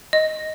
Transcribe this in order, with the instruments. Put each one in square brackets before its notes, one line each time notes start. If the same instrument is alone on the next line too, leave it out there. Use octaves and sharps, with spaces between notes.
[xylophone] D#5